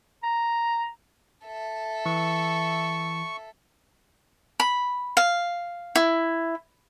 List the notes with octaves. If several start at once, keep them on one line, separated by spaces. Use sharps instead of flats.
A#5
A4 E5
E3 C#6
B5
F5
E4